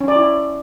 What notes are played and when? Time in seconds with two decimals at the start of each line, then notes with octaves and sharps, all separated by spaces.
0.01 C#4
0.08 D5
0.16 E4